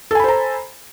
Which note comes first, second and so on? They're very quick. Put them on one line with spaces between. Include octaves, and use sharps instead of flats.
A4 G#5 B5 C5 A#5